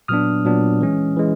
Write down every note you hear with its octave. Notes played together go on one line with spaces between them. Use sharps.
A#2 F#3 B3 D4 D#6 F6
A#2 F#3 B3 D4
E3 G#3 C#4
E3 G#3